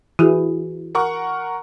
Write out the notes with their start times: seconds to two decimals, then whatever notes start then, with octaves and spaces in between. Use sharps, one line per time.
0.19 E3 E4 F#4 G#4
0.95 A#4 F#5 C#6